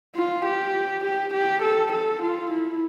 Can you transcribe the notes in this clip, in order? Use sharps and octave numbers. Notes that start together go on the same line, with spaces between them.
F4
G4
G4
G4
A4
A4
F4
E4